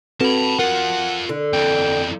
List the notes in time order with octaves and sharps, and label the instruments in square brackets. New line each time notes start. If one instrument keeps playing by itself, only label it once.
[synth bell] C4 A4 B4 [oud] F#4 [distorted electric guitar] A5 B5
[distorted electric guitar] F4 A4 [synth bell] A#4 [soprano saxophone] F#5
[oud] D3
[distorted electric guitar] F2 E3 [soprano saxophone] G5